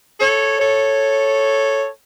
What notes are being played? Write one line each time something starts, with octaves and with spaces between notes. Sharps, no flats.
A4 C#5
A4 C#5